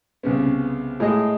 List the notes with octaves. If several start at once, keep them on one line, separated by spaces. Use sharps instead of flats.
C2 C#3 B3
A2 G#3 G#4 D#5